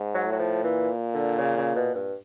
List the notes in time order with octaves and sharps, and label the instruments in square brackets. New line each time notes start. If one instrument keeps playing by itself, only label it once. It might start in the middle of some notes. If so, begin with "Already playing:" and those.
Already playing: [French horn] G#2
[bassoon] F#3
[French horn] A2
[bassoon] F#3
F3
[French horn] A#2 [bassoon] E3
[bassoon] D3
C#3
C#3
B2
G2